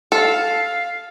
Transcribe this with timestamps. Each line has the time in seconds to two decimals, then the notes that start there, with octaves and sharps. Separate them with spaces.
0.12 A4 F5